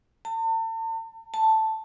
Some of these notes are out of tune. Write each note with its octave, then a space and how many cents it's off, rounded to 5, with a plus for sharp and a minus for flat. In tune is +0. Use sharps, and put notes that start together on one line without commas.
A5 +40
A5 +5